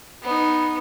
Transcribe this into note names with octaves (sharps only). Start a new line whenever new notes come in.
B3 D#4